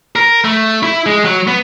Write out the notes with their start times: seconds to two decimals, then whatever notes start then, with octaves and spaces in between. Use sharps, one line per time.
0.16 A#4
0.45 A3
0.83 E4
1.06 G#3
1.25 F#3
1.47 B3